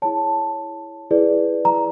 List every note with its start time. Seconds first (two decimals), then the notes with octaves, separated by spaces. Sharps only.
0.02 E4 G#4 C#5 A5
1.11 E4 G#4 B4 D5
1.65 A#5